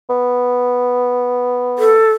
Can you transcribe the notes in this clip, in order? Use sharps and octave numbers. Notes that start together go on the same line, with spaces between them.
B3
A4